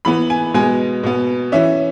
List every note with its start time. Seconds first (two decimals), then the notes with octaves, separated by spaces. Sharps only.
0.05 E3 B3 B5
0.30 G#5
0.54 B2 G#3 B3 G#5
1.03 B2 B3
1.52 E3 C#4 E5